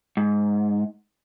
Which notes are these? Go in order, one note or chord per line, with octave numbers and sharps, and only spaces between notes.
G#2